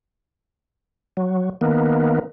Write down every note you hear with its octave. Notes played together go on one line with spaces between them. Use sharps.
F#3
D#3 A#3 B3